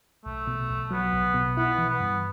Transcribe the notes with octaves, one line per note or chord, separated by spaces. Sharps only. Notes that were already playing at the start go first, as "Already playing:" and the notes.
B1 A3
B2
B1
F#3 B3
B1
B2
B3 E4
E3
B3
G2